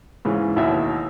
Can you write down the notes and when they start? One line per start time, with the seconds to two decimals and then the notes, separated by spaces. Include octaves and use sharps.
0.25 G#2 C#3 E3
0.56 A1 D#2 B2 F#4 E5